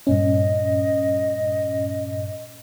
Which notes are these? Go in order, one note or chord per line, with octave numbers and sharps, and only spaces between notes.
G2 A#2 C#4 D#5